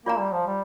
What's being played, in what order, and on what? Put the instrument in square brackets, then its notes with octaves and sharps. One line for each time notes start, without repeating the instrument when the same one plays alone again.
[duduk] A#3 [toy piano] F4 D5 A#5
[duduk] G3
F3
G3